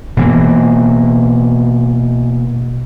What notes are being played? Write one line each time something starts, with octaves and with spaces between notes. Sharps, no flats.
B2 E3 A#3